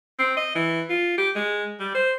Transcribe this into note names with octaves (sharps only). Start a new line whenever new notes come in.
C4
D#5
E3
F4
G4
G#3
G3
C5